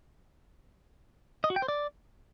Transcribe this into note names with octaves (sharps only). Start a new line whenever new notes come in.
D#5
F#4
G5
C5
D5